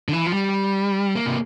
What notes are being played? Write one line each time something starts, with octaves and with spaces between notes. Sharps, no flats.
D3
E3
F3
G3
A#3
C3